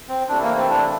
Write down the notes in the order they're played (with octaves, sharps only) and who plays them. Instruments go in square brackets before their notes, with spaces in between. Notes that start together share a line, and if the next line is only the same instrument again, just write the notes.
[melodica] C4
[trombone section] C3 E3 A3 E4 G4 [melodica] D4
[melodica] A#3
C4
D4